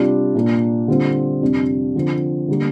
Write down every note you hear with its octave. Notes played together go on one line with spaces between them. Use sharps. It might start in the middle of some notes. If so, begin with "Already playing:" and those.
Already playing: C3 G3 D4 F4
A#2 A#3 D4
D3 G3 C4 F4
F2 C3 G3 D4
D3 F3 C4
D3 G3 A#3